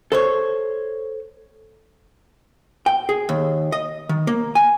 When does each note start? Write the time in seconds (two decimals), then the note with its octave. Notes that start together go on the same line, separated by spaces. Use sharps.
0.12 A4 C5 C#5
2.86 G5
3.09 G#4
3.29 D#2
3.72 D#5
4.09 D#3
4.27 A#3
4.55 G#5